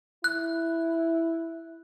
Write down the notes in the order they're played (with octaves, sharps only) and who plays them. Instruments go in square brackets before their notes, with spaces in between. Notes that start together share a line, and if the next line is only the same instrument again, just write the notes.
[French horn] E4 [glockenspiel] F#6